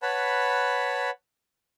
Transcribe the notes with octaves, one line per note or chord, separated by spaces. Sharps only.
B4 C#5 F#5 A5 B5